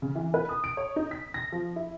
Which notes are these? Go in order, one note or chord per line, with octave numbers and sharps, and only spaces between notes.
C#3
E3
B4
D#6
D7
C#5
D#4
B6
A#6
F3
E4